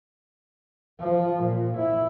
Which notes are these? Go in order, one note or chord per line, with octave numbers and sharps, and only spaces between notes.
F3
A#2
E4